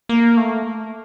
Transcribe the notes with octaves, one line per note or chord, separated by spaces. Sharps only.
A#3
A3